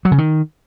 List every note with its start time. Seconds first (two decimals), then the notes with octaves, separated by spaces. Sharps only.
0.05 F#3
0.12 C#3
0.18 D#3